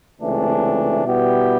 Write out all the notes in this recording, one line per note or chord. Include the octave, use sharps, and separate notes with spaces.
C#2 C3 E3 A3 D4
B2 G3 B3 E4 G4